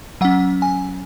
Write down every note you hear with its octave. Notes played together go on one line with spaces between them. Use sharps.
F#3 C#4 F#5
G#5